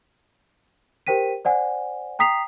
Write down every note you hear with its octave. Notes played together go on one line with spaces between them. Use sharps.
G4 A#4 C5 G5 B6 D#7
C5 D5 F#5 G#5
G5 A#5 D#6 B6 C7 F7